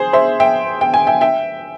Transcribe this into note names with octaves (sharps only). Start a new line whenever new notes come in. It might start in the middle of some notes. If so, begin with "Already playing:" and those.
Already playing: G#4 C5
C5 E5
E5 G5
G5
G#5
E5 G5
E5 G5